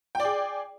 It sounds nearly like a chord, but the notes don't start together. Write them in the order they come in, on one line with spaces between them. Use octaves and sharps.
G5 D5 G#4